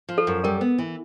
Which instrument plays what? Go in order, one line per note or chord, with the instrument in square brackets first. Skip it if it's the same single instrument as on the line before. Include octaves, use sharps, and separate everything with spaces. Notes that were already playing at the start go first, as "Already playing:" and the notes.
[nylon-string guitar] F3
[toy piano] A4
[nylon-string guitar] F#2
[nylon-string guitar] G3 [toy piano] A#4
[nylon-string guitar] B3
E3